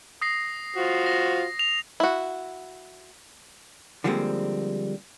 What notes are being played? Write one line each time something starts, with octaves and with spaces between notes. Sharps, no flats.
D#6 A#6 C7
F4 F#4 C5
A#6
F7
E4 F#4
D3 F3 G3 G#3 A#3 C4